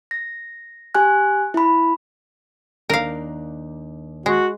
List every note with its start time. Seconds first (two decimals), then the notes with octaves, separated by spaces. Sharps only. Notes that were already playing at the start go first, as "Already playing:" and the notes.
0.11 A#6
0.94 G4 G#5 F#6
1.54 E4 B5
2.90 D#2 D4 D#4 A#4 F5
4.26 G#3 F#4